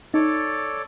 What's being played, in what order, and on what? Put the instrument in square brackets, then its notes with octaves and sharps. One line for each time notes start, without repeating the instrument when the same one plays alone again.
[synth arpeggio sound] D#4 [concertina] A4 C#5 D5